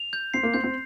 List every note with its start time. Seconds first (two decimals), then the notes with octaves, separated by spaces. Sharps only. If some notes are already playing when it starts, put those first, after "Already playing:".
Already playing: F7
0.13 G6
0.34 C4 C7
0.43 A#3
0.54 C4 G6
0.64 C4